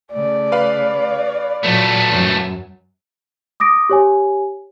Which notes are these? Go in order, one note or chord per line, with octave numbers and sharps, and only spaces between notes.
C#3 A3 D5
B4 F5 B5
A#2 F#3 A3 B3
F#2 F#3
D6 D#6 A#6 D7
G4 C#5 G#5